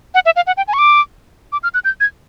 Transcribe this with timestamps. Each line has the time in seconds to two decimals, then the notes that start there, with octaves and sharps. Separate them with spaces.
0.14 F#5
0.25 E5
0.36 F5
0.47 F#5
0.57 G5
0.68 G#5
0.73 C#6
0.79 D6
1.52 D6
1.63 F6
1.74 F#6
1.85 G6
2.00 G#6